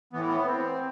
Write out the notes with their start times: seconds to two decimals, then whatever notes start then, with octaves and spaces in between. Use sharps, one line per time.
0.13 A2 E3 B3
0.27 B3
0.46 C4